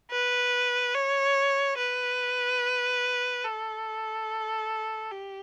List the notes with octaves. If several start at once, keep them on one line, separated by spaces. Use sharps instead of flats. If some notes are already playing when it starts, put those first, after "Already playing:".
B4
C#5
B4
A4
G4